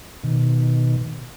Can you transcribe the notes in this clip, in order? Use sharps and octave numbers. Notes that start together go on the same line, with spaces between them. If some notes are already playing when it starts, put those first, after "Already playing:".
B2 D#3